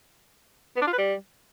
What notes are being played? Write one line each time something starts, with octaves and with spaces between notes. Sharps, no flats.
B3
D4
F4
B4
G3